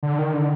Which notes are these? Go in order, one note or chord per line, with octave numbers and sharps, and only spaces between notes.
D3
D#3
D3